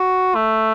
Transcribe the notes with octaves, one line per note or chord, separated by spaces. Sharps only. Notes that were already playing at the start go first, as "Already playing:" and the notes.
Already playing: F#4
A3